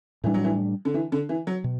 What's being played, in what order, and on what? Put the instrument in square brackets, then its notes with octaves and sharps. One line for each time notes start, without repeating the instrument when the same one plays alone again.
[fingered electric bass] A2 G3 D4 [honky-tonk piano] E3
[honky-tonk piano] F#3
E3
D3
E3
D3
E3
F#3
[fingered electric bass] B2